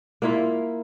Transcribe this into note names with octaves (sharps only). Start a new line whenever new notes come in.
A#3 E4 F4